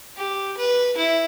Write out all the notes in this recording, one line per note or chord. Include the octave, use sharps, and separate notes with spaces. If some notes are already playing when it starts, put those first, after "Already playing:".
G4
B4
E4